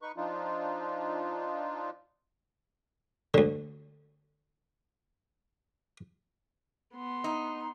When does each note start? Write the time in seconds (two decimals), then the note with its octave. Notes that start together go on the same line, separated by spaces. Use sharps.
0.02 D#4 B4 C#6
0.17 F3 D4 D#4 F4
3.34 D2 D3
6.94 B3 C6
7.24 D#4